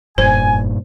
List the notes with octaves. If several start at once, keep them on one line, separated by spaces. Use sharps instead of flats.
F1 G2 A#2 C5 G#5